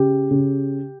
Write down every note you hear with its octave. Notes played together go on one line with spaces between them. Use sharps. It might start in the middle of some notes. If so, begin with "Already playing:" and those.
Already playing: C#3 G4
C#3